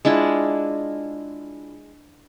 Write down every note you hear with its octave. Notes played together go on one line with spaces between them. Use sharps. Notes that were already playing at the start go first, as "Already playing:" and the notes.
G#3 D4 E4 F4